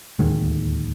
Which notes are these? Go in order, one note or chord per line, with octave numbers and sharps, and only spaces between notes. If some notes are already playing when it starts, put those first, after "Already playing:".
D1 D#2 D#3 G#3